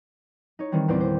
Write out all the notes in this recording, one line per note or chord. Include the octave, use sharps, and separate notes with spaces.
D#4 C#5
D#3 E3 G3 C4
E2 A#2 C4 C5 D5 G5
C5